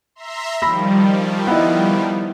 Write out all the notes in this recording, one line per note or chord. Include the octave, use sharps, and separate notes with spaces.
E5 A#5 C6
D#3 F3 G3 B5 E6 A#6
B3 E4 D#5